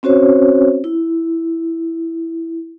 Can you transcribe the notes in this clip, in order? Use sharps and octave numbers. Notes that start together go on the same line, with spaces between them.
C4 C#4 F#4 C5 C#5
E4